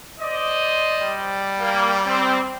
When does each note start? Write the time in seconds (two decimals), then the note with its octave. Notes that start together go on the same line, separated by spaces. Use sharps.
0.20 C5 D5 D#5
1.02 G3
1.60 A#3
2.06 C4